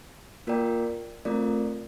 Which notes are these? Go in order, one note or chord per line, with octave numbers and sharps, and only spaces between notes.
A#3 F4 A#4 D5 G5
A3 C4 F4 A#4 D5